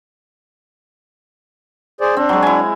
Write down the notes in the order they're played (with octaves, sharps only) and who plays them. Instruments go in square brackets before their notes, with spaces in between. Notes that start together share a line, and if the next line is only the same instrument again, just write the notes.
[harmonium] G#4 C5 D5
[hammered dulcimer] C4 [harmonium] D4
[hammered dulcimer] F#3 G#3
E4 G#5